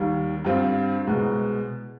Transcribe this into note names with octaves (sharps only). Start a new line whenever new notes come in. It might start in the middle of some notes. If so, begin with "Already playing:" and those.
Already playing: D#2 D#3 G3
G2 D3 G3 C4 F4
C2 B2 G#3